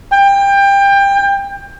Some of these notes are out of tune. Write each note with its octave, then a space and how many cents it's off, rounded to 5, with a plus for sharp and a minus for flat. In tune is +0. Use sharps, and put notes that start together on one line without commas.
G5 +25